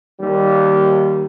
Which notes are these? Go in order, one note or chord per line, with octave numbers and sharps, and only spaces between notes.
D#2 G3